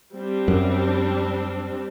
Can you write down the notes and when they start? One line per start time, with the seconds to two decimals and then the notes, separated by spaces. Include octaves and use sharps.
0.16 G3 C4 D4
0.48 F#2